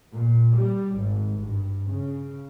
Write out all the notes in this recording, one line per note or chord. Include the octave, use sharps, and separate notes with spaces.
A#2
G3
G#1
G2
C#3